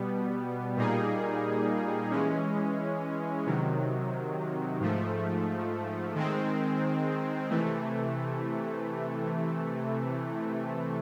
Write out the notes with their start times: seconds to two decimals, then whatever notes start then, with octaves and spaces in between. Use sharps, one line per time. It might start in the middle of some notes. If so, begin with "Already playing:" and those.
Already playing: B2 G3 B3
0.77 A#2 G3 A#3 D#4 G#4
2.11 E3 G#3 C#4
3.46 C3 D#3 F#3
4.80 G#2 F3 A3
6.15 D#3 G#3 C4
7.50 C3 E3 A3